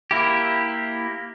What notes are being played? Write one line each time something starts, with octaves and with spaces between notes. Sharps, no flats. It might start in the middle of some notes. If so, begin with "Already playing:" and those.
A#3 E4 G4